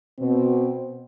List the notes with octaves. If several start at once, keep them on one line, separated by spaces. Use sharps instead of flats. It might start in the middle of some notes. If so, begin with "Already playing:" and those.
B2 C4